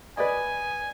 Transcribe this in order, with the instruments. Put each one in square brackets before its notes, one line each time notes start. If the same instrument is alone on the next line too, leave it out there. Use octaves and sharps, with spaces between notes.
[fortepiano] B4 D5 D#5 [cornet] G#5